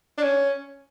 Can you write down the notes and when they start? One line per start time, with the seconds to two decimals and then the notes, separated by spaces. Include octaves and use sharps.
0.18 D4
0.23 C#4